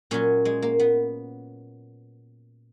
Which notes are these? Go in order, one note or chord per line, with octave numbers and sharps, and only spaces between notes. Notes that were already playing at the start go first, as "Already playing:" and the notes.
A#2 F#3 C#4
G#3
A#3
B3